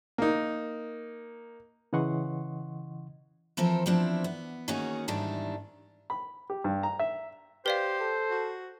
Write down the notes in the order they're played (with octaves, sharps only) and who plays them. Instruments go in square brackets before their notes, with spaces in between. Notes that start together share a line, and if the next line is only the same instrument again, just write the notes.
[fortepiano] A#3 D#4
[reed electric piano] C#3 E3 D#5 F#5 C6 C#6
[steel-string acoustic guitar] E3 F3 C4 A4 A#4 C5
F3 B3 C4 D4 E4
B3
D#3 A#3 C#4 D#4 F#4 G#4
E2 G#2 D#3 G3 D4 E4
[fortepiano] B5
G4
G2
A#5
E5
[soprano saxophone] G4 [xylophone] B4 D5 F5 [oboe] C5
[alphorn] A4
[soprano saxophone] F#4